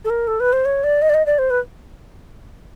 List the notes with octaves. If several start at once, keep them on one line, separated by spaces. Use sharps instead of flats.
A4
A#4
A4
B4
C5
C#5
D5
D#5
D5
D#5
D5
C5
B4